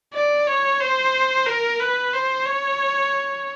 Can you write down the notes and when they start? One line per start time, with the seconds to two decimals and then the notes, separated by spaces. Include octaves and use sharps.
0.14 D5
0.47 C#5
0.80 C5
1.47 A#4
1.80 B4
2.13 C5
2.46 C#5